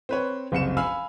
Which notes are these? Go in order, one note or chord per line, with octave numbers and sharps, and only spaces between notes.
C4 B4 C#5
F#1 C2 C#7 E7
F5 G#5 B5 E6 F6